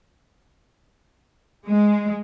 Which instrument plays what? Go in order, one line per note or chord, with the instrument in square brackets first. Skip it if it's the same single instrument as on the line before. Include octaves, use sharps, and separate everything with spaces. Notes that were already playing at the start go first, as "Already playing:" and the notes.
[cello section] G#3